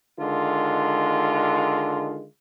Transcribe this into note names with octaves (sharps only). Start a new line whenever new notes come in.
D3 D#3 G#3 F4